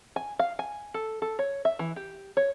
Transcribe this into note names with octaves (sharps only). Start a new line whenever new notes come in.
G#5
F5
G#5
A4
A4
C#5
E5
E3
G4
C#5